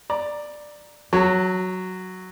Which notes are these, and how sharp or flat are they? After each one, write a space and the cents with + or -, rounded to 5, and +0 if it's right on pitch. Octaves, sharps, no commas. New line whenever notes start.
D5 +10 A#5 +0
F#3 +0 F#4 +0 A5 +45